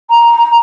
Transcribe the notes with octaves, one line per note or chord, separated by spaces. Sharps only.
A#5